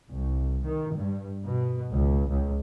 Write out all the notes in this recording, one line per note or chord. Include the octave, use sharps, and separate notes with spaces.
C2
D#3
G2
B2
C#2
C#2